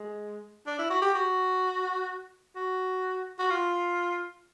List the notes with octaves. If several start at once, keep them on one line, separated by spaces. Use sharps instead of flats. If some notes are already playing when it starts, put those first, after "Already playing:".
Already playing: G#3
D4
E4
F#4
G4
F#4
F#4
F#4
F4